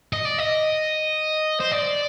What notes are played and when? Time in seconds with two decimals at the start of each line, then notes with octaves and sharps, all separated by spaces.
0.13 D#5
0.25 D5
0.39 D#5
1.60 C5
1.71 D5